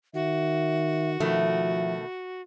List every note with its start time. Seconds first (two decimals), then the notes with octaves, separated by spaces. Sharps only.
0.14 D#3 F#4 E5
1.20 B2 D#3 F3 A3 E5